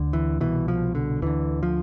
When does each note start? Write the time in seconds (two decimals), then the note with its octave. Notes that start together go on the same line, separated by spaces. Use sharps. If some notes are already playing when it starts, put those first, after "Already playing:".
Already playing: D2 D3
0.13 E3
0.41 C2 B2 E3
0.68 F3
0.95 D3
1.22 D2 D3 E3
1.63 F3